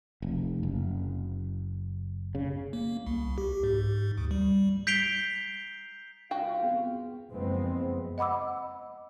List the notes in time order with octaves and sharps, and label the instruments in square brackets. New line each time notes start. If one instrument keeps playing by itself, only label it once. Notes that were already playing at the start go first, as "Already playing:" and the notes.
[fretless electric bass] F1
F#1
C#3
[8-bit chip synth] A#3
C2
G4
G#2
D2
G3
[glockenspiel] G6 B6 C7 D7 F7 G7
[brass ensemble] C#2 F4 F5 [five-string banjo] F#4 G5
[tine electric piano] B3 C4 G#4
[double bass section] F#1 F2 G#3 B3 C4
[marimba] D#5 F#5 B5 D6 E6